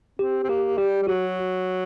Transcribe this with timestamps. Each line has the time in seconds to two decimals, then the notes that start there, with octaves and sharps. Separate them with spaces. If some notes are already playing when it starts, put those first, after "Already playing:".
0.19 C4 G4
0.44 C4
0.49 A#3 G4
0.78 G3 G4
1.02 G3
1.07 F#3 F#4